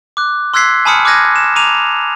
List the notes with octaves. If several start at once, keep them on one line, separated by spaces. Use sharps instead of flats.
D6 F#6
C6 E6 F#6 G#6 B6 C7
G#5 A5 B5 D#6 F6 C#7
D6 F6 F#6 G#6 A#6 D#7
E7
A#5 D6 D#7 F7